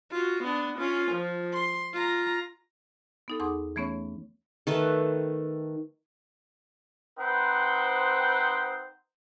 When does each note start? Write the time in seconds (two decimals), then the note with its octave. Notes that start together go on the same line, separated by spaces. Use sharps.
0.12 F4 F#4
0.44 B3 D4
0.78 C#4 F4
1.11 F3
1.53 C6
1.93 F4 A#5
3.28 B3 D#4 A4
3.40 E2 G#4 F#5 C6 D6 D#6
3.76 E3 A3 B3 C#4 C#5
4.67 D#3 A3 B4
7.19 C4 D#4 B4 C5 F#5 G5